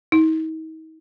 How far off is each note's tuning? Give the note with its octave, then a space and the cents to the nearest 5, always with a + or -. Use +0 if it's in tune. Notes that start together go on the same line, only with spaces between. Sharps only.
D#4 +40